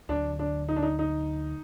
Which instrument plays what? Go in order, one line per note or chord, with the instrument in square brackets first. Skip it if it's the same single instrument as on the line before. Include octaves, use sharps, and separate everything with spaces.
[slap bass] D2 D3 F#3 [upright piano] D4
[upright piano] D4
D#4
D4
D#4
D#4